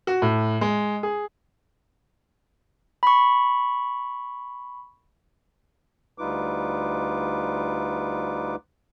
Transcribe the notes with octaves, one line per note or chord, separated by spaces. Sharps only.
F#4
A2
G#3
G#4
B5 C#6
D2 G3 D#4 F4 B4 D6